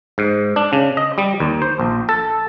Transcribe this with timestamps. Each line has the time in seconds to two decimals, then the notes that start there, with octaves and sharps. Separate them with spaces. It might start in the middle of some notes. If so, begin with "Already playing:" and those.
0.18 G#2
0.56 D4
0.73 C#3
0.97 D#5
1.18 G3
1.40 D#2
1.62 C5
1.79 A#1
2.09 A4